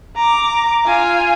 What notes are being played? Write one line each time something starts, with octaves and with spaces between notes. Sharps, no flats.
A#5 D6
F4 G#5